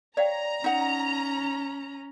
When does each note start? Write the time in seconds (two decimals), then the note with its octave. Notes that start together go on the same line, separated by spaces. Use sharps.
0.17 C#5 D5 F5 G5 A#5
0.64 C#4 D#4 F#5